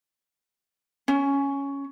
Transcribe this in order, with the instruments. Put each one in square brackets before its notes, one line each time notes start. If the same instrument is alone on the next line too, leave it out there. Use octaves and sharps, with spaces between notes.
[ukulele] C#4